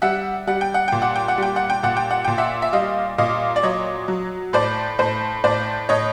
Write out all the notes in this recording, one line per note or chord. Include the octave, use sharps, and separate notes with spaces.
G3 E5 F#5
G3 F#5
G5
F#5
A#2 G5
F#5
G5
F#5
G3 G5
F#5
G5
A#2 F#5
G5
F#5
A#2 G5
E5 F#5
E5
G3 D#5 F5
A#2 D#5 F5
D5
F#3 C#5 D#5
F#3
A2 C5 D5
A2 C5
A2 C5 D5
A2 C#5 D#5